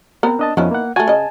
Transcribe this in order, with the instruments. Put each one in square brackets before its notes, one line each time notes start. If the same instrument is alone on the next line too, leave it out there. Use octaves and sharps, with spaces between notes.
[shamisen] B3 C4 A#4
[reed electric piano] D4 D#5 A5
[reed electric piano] F2 F3 C#4 [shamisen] D#3 B3 E4
[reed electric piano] A#3 F#5
[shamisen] A3 F#4 [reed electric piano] G#5 A5
[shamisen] C#3 D#5